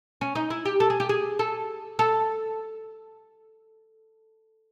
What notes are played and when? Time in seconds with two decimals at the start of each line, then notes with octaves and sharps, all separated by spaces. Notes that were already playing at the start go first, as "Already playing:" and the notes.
0.21 C#4
0.35 D#4
0.50 E4
0.65 G4
0.80 A4
0.90 G#4
1.00 G4
1.09 G#4
1.39 A4
1.99 A4